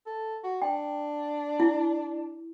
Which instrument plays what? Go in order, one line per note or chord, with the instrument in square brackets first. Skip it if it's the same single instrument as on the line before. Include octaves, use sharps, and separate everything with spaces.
[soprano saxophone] A4
F#4
[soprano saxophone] D4 [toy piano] G5
[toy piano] E4